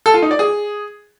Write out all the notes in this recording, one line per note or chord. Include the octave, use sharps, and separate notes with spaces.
A4
F4
D#4
D5
G#4